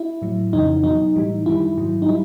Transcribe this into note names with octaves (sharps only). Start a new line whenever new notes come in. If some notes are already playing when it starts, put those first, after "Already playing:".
Already playing: E4
A2 F#3
F2 C#3 E3 D#4
B2 F#3 D#4
A2 E3 G3
F#2 D#3 G3 E4
G#2 D#3 F#3
D#4
G3 E4